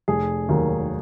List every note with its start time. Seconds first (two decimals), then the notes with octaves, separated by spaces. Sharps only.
0.08 F1 G#4
0.49 D#2 D#3 F#3